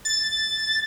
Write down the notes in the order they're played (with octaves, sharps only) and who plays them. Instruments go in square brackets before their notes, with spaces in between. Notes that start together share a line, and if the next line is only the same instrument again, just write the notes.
[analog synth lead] A6